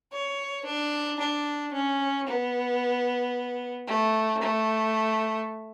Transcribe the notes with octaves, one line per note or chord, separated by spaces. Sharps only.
C#5
D4
D4
C#4
B3
A3
A3